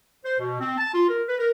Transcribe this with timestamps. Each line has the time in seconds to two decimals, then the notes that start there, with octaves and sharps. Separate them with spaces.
0.24 C5
0.39 B2
0.60 C4
0.78 A5
0.94 F4
1.08 A#4
1.27 B4
1.39 A#4